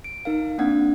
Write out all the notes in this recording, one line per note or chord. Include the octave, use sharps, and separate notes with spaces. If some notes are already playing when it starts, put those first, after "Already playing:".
D7
D#4 A#4 F5
A#3 C4 D4 F#5 G#6